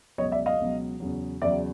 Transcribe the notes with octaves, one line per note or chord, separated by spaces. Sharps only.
C#2 B2 F#3 C#5 D#5
D5 E5
D#5 F5
C#2 B2 F#3
E2 C#3 F#3
E2 C#3 F#3 D5 E5